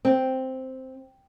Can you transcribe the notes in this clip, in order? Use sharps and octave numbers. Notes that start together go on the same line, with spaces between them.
C4